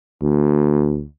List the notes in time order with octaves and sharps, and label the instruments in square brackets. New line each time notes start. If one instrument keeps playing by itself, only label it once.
[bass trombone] D2